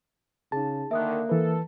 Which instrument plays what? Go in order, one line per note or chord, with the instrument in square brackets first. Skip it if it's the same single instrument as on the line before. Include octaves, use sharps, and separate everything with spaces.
[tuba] C#3 [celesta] D#4 G#4 [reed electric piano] A5
[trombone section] D3 D#3 [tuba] A#3 [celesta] E5 D#6 F#6
[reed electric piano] E3 B4 [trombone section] A4